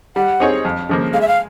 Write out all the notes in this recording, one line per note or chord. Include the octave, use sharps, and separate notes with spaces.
G3 F#5
C4 D#4 G#4 C#5
F2
C#3 F3 A#3
G#3 F5
E5
F5